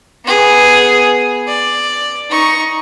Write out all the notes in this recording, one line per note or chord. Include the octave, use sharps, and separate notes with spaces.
B3 G#4
D5
D#4 C#6